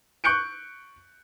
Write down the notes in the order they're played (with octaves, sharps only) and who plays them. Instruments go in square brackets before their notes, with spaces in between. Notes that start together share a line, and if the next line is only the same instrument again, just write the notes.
[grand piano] C#6 F#6 G6 C#7 D7